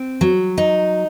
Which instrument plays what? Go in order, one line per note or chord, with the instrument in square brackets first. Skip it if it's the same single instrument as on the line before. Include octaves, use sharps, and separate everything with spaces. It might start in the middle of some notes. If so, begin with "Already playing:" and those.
Already playing: [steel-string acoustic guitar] C4
F#3
D#4